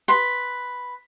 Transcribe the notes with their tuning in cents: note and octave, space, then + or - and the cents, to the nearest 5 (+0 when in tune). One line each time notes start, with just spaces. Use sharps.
B4 +0 C6 +0